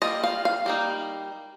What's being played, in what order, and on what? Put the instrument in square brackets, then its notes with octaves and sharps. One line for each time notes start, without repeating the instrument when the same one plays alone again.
[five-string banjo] G3 A#3 F4 D#5
F5
F5
G3 A#3 D#4